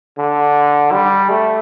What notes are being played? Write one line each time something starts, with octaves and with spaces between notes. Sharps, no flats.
D3
G3
A3